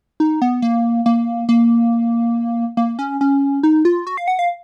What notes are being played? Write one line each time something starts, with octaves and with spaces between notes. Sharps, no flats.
D#4
B3
A#3
A#3
A#3
A#3
C#4
C#4
D#4
F4
F#4
F5
F#5
F5